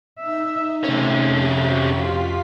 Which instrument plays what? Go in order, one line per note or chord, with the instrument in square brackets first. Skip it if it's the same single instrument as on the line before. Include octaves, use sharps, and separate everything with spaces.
[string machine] D#4 [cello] E5
[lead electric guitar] C3 C#4 [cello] A3
[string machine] F2 G4 B6
[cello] F#4
F4